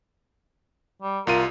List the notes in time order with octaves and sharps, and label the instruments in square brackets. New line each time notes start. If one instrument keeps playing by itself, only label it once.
[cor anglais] G3
[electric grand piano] C2 F4 D#7 [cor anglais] A#4